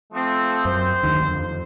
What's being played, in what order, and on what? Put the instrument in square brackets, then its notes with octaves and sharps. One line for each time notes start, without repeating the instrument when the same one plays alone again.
[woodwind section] F3 A3 C4
[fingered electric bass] F#2 [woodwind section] C5
[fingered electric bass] D#2 D3 D#3
F2